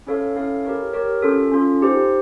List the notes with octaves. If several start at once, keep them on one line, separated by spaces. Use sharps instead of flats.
C#4 E4 A4 C#5 F5
C#4 E4 A4 C#5 F5
G4 A#4 C#5
G4 A#4 C#5
C#4 F4 A4
C#4 F4 A4
D#4 G4 C5